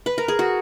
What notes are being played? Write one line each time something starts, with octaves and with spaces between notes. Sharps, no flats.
B4
A#4
G#4
F#4